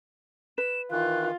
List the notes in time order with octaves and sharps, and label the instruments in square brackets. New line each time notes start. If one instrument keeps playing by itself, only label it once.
[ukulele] B4 [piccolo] E7
[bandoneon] D#3 E3 [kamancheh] F4 [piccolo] F#6